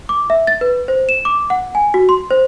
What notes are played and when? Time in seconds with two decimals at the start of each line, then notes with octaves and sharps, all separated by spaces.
0.09 D6
0.30 E5
0.47 A6
0.61 B4
0.88 C5
1.09 E7
1.25 D6
1.50 F#5
1.75 G#5
1.94 F#4
2.09 C6
2.31 C5